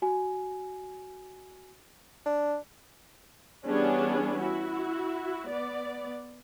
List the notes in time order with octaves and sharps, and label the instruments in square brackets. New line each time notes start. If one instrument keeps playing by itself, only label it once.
[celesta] F#4 G#5
[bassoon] D4
[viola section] E3 G3 B3 C#4 D4 G#4
E4 F#4
B3 D5